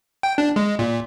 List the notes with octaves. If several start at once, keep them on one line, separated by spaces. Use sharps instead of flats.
G5
D4
G#3
A#2